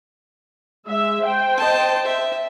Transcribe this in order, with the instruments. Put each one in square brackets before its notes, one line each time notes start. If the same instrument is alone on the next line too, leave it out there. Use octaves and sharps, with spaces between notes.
[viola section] G#3 E5
C5 G5
[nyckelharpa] D#5 A5
E5